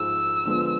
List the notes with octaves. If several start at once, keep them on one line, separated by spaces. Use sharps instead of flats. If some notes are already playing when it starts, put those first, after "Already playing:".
Already playing: G#2 F3 G#3 E6
D3 F3 G#3 B3